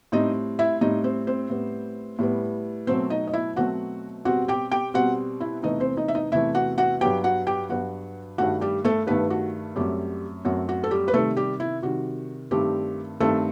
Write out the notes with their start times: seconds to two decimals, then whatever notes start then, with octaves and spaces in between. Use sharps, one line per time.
0.12 A2 G3 C4 D#4 D#5
0.59 E4 E5
0.81 A2 G3 C4 D#4 D#5
1.04 C4 C5
1.27 C4 C5
1.50 A2 G3 B3
2.19 A2 G3 B3
2.87 B2 F#3 A3 C4 C5
3.10 D#4 D#5
3.27 D#5
3.33 E4 E5
3.56 B2 F#3 A3 C4 F#4 F#5
4.25 B2 G3 C4 F#4 F#5
4.48 G4 G5
4.72 G4 G5
4.94 B2 G3 C4 F#4 F#5
5.40 E4 E5
5.63 E2 C3 E3 A3 D#4 D#5
5.80 C4 C5
5.97 D#4 D#5
6.08 E5
6.15 D#4 D#5
6.32 E2 C3 E3 A3 E4 E5
6.55 F#4 F#5
6.78 F#4 F#5
7.01 G2 F#3 B3 G4 G5
7.24 F#4 F#5
7.47 G4 G5
7.70 G2 F#3 B3 F#4 F#5
8.38 G2 D#3 A3 F#4 F#5
8.61 G3 G4
8.84 A3 A4
9.07 G2 D#3 A3 B3 B4
9.30 F#4
9.76 F#2 F#3 G3 A3 C4 G4
10.45 F#2 F#3 A3 C4 F#4
10.69 F#4
10.84 A4
10.91 G3 G4
11.08 B4
11.14 C3 D#3 G3 A3 A4
11.37 G3 G4
11.60 E4
11.82 C3 D#3 G3 F#4
12.51 G2 D#3 G3 A3 C4 G4
13.20 G2 D#3 A3 C4 A4